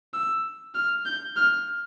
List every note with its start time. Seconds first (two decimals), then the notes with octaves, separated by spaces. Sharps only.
0.14 E6
0.75 F6
1.06 G6
1.36 F6